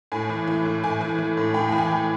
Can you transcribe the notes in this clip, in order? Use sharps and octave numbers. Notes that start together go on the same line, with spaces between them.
A2 G#5
E3
E3
A2
A2 G#5
E3
E3
A2
A2 G5
E3 G5
G#5
E3